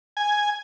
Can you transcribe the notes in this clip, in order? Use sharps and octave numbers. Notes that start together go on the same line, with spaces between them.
G#5